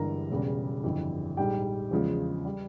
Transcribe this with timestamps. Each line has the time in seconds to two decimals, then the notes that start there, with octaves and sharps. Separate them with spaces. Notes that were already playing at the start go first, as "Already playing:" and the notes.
Already playing: G1 G2 E3 G#3 A#4 A#5
0.30 E1 E2 C#3 G3
0.84 G1 F2 E3
1.37 A#1 G#2 G3 G4 G5
1.91 E2 C#3 F3 G#3
2.45 G3